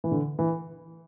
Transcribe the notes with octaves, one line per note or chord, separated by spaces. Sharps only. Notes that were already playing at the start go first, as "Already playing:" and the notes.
E3
D3
E3